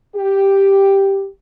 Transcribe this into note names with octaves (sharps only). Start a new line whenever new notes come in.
G4